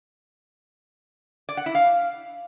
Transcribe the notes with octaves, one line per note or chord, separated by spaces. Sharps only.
D5
F#5
E4
F5